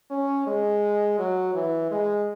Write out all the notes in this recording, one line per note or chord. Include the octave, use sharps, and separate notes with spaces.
C#4
G#3
F#3
E3
G#3